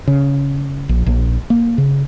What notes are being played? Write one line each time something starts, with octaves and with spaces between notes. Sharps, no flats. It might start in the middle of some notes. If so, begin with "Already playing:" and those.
C#3
A#1
A#1
A#3
C#3